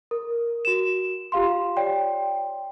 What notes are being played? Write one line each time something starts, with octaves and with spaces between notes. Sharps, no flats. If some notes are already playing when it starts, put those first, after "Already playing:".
A#4
F#4 E7
F4 G4 F5 C6
C#5 D5 G5